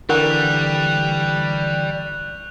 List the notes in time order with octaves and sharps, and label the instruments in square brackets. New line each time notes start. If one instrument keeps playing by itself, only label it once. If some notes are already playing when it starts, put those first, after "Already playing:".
[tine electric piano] D3 E3 [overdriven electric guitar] G3 [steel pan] A#4 F#5 [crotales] C#6 F#6 F7